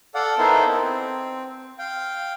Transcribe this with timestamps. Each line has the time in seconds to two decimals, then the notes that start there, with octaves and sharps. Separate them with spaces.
0.15 A4 D5 F5 F#5
0.38 B3 D#4 E4 A4 A#4 C5
0.68 C4
1.79 F5 G5